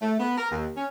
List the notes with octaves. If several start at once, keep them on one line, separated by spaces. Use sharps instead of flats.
A3
B3
A#4
D#2
C#4